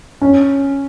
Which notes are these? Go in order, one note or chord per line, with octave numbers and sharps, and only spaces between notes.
C#4